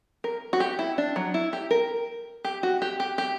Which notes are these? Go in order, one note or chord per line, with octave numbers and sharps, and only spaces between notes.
A#4
F#4
G4
E4
D4
F#3
E4
G4
A#4
G4
F#4
G4
G4
G4